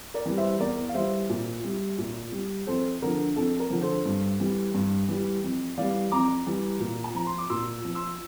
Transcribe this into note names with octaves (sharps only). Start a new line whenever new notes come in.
A#4 D5
E3 G3
C5 E5
E2 A#4 D5
F5
E3 G3 C5 E5
A#2
G3
A#2
G3
F2 A4 C5
D3 F3 A#4
F2 A4
A#4
D3 F3
A4 C5
G2
E3 G3
G2
E3 G3
F2
E3 G3 D5 F5
F2 A#5 D6
E3 G3
A#2
A5
F3 A#5
C6
D6
A#2 C6 E6
F3
C6 E6